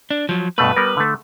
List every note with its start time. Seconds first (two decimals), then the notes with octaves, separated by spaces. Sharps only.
0.11 D4
0.29 F3 F#3
0.58 G2 B2 A3 B4
0.76 G3 B3 A#4
0.97 D3 A3